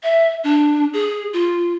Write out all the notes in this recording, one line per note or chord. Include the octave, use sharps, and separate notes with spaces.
E5
D4
G#4
F4